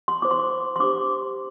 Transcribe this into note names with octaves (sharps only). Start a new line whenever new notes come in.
C6
E4 C5 D6
C6
D6
C6
D4 G4 C5 D6